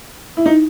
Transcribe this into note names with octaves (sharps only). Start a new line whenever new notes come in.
E4
D#4